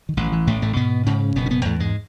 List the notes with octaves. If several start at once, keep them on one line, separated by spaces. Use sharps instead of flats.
D#3
A1 E3
E3
A1 A2 A3
A2 A3
G#2 B2 B3
G#2 C#3 C#4
F#1 B2 B3
C#4
B2 B3
E2 A2 A3
G#2 G#3